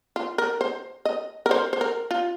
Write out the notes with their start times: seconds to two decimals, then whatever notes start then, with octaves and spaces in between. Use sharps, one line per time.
0.16 F4
0.38 A#4
0.61 C5
1.05 D#5
1.46 A#4
1.51 C5
1.73 C5
1.81 A#4
2.11 F4